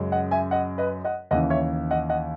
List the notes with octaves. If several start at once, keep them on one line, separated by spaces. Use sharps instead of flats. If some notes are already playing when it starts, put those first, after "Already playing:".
Already playing: F#2 C#3 G#3
D#5 F#5
E5 G#5
D#5 F#5
B4 D#5
D#5 F#5
D#2 C#3 E3 D#5 F#5
C#5 E5
D#5 F#5
D#5 F#5